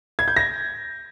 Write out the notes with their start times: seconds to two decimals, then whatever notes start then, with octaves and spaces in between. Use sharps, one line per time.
0.19 G#6
0.28 G6
0.37 A#6